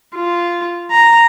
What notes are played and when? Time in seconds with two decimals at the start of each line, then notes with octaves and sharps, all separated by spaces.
0.16 F4
0.91 A#5